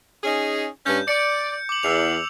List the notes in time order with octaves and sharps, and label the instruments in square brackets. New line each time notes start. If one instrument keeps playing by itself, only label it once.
[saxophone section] C#4 D#4 G#4
[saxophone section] G2 C#4 [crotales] G6
[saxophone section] D5 [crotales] C#7
[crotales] D6 F#7
[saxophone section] E2 [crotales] E6 F7